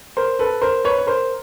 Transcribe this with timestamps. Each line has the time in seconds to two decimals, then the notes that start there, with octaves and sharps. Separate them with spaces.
0.17 A#4 C5
0.39 A4 B4
0.62 A#4 C5
0.84 B4 C#5
0.98 C#5
1.07 A#4 C5